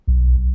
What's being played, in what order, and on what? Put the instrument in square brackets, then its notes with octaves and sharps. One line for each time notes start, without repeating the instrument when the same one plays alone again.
[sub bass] B1